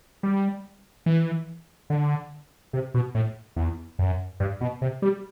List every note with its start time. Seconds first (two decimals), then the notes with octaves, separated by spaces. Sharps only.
0.23 G3
1.06 E3
1.90 D3
2.73 C3
2.94 B2
3.15 A2
3.56 E2
3.99 F#2
4.40 G2
4.61 B2
4.81 C3
5.02 G3